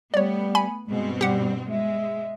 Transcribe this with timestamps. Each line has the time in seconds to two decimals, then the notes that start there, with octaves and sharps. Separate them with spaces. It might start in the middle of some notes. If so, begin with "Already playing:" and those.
0.14 G3 A3 B3 C#5 D5
0.55 G#5 B5
0.87 G2 B2 G#3 C4
1.21 G3 G4 F#5
1.69 G#3 E5